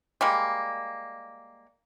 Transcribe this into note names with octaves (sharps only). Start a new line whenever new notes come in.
G3 G#3 A#3